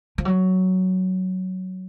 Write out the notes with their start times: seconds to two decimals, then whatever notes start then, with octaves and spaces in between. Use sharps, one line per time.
0.18 F3
0.25 F#3